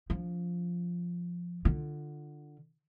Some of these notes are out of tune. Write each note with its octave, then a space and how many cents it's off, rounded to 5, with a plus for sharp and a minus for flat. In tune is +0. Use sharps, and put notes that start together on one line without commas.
F3 +0 D4 -45
D3 +15 F4 +0